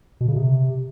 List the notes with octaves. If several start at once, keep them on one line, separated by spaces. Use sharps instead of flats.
B2
C#3
C3